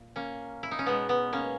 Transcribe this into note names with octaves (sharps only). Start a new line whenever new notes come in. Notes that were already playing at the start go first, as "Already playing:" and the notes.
Already playing: A#2
A#3 C#4
E4
D#4
C#4
B2 G#3 B3
B3
A#3 C#4